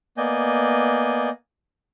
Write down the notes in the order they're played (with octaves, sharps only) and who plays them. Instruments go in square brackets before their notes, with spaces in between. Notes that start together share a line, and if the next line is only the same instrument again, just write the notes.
[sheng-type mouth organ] A#3 B3 D5 D#5 G#5 G6